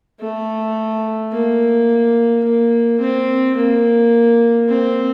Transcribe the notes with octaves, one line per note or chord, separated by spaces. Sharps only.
A3
A#3
A#3
C4
A#3
C4